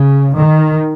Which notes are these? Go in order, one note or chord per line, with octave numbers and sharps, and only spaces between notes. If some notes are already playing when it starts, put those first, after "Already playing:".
Already playing: C#3
D#3